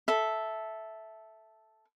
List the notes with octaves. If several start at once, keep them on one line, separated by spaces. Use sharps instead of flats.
A4 E5